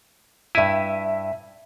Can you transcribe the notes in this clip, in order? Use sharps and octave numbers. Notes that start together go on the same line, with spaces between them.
G2 E4 E5 D#7